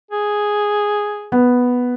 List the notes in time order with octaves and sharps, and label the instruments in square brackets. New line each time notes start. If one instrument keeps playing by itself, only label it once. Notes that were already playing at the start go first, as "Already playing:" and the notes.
[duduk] G#4
[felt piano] B3